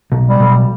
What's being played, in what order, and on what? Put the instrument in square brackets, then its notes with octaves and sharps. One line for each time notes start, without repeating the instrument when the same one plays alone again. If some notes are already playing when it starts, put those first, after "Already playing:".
[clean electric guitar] B1
[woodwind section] G3
[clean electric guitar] B1